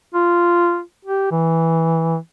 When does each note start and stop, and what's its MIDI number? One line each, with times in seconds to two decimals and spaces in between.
0.14 0.80 65
1.05 1.27 67
1.31 2.17 52